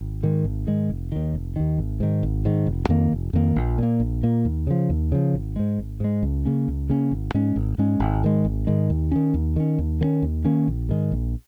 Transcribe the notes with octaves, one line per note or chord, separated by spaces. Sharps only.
G#1
G#2 D#3 G#3
G#1
G#2 D#3 G#3
F1
D#2 D#3
F1
D#2 D#3
G#1
G#2 D#3
G#1
G#2 D#3
F1
F2 D#3 A#3
F1
F2 D#3 A#3
A#1
A#2 A#3
A#1
A#2 A#3
D#2
C#3 F3
D#2
C#3 F3
G#1
G#2 G#3
G#1
G#2 G#3
C#2
C#3 A#3 C#4
C#2
C#3 A#3 C#4
G#1
G#2 G#3 C#4
G#1
G#2 G#3 C#4
G#1
G#2 D#3 G#3
G#1
G#2 D#3 G#3
D#2
D#3 C#4
D#2
D#3 C#4
D#2
D#3 A#3 C#4
D#2
D#3 A#3 C#4
A#1
G#2 D#3 G#3
A#1